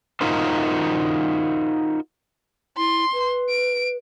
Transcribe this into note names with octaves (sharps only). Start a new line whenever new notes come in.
D#4 F4 F#4 A#4 C5
E4 C6
B4
D7